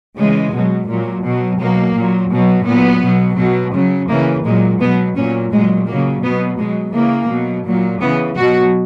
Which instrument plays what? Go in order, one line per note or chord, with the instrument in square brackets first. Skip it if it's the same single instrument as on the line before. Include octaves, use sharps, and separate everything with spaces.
[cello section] C#3 E3 G#3
B2 F#3
A#2 F#3
B2 F#3
B2 F#3 A#3
A#2 F#3
B2 F#3
A#2 F#3 B3
B2 F#3
B2 F#3
C#3 F#3
C#3 E3 A#3
A#2 F#3 G#3
B2 F#3 B3
A#2 F#3 C#4
A#2 F#3 G#3
C#3 F#3 A#3
B2 F#3 B3
B2 F#3 G#3
C#3 E3 A#3
B2 F#3
A#2 F#3
C#3 E3 B3
B2 F#3 F#4